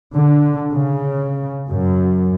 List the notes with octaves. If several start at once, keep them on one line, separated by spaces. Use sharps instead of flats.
D3
C#3
F#2